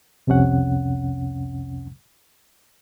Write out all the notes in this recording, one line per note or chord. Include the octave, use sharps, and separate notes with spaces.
C2 F2 C3 C#4 F#5